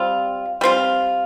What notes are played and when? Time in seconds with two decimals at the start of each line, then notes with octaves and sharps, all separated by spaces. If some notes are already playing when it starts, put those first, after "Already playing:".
Already playing: G3 C4 F4
0.61 G3 C4 F4